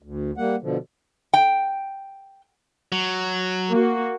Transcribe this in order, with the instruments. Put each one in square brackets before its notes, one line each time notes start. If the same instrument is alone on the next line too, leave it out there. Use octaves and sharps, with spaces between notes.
[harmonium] D2
G3 A#3 F#5
B2 D3 F3
[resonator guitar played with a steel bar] G5
[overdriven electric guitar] F#3
[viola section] A#3 F#4